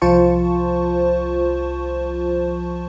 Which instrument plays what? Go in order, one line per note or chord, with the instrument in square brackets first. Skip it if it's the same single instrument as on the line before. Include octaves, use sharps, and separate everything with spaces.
[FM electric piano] C2 F3 F4 C5 A5 C#6